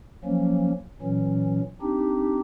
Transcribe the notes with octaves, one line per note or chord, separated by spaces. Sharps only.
F3 F#3 A#3 C#4
A#2 E3 F#3 C#4
C4 D4 D#4 G4